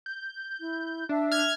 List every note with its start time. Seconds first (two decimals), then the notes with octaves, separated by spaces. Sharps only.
0.06 G6
0.60 E4
1.09 D4 E5
1.32 F6 G#6